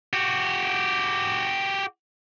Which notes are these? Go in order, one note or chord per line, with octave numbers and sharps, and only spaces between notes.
F#4 G4